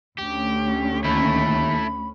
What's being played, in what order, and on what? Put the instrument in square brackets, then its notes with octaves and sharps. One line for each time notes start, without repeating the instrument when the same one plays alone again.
[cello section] D2 C#4 [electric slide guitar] G4
[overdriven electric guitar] D#2 [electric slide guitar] A3 E4 [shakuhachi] B5